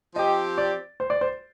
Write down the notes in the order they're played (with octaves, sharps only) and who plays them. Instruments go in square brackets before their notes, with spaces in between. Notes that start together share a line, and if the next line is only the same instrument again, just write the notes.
[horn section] F3 C4 G4 [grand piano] D#5
[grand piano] D5
C5
D5
C5